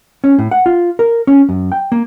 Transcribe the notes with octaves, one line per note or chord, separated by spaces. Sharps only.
C#4
A2
F#5
F4
A#4
C#4
F#2
G5
A#3